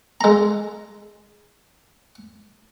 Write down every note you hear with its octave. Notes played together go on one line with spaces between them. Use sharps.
G#3 A#5